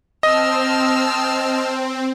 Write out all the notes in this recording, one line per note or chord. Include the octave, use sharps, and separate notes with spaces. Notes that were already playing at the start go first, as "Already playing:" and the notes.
C4 D#5 A5 E6 F6